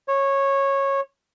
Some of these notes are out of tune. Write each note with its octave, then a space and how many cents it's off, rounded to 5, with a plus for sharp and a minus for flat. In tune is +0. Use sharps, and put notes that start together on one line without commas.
C#5 -15